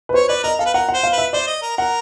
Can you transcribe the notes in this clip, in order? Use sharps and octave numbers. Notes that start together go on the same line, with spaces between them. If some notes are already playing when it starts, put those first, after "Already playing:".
B4
C5 C#5
B4 D5
A#4 D#5
A4 F5
B4
A#4 F#5
F#5
C5
F5
B4
E5
C5 D5
D#5
A#4
A#4 F#5